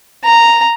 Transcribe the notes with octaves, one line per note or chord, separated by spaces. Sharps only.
A#5